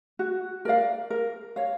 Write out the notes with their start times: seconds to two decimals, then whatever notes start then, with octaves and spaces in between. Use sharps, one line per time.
0.19 F#4
0.65 A#4 D5 F5
1.10 A#4
1.56 C#5 F5